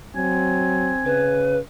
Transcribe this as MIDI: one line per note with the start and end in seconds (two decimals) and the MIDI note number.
0.16 0.95 54
0.16 1.28 60
0.16 1.40 80
1.05 1.59 49
1.05 1.57 71